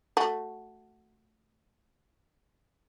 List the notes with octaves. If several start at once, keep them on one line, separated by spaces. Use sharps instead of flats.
A3 F#4